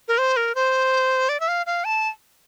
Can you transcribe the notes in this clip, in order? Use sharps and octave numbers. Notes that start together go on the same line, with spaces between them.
A#4
C5
A#4
C5
D5
E5
F5
F5
A5